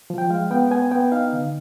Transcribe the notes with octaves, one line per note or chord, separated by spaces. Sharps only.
F3
G5
G#3 F5
B3 G5
B3 G#5
B3 G5
D#4 F5
D3